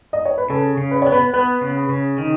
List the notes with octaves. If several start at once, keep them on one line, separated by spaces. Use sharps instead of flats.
D#5
C#5
B4
C#3 A4
C#3
B4
B3 C#5
B4
B3 B4
C#3
C#3
D#3